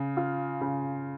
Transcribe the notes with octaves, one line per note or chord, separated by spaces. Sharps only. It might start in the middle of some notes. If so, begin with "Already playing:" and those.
Already playing: C#3
F4
C#3